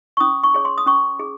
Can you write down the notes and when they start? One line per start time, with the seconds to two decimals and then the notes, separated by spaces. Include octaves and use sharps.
0.17 C#6
0.20 C#4 D#6
0.43 C#6
0.54 G#4 C#5
0.65 C6
0.78 D#6
0.86 C#4 C#6
1.19 G#4